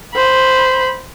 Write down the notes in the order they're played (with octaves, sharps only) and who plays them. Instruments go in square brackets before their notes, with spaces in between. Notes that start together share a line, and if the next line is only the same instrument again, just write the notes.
[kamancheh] C5 B5